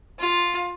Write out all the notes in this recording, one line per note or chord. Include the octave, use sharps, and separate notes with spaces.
F4